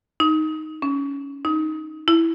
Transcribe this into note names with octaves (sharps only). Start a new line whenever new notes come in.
D#4
C#4
D#4
E4